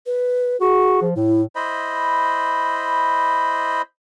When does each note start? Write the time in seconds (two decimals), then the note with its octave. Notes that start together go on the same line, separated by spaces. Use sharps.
0.06 B4
0.61 F#4 G#4
1.01 F3
1.16 A2 E4
1.56 E4 C5 D#5 B5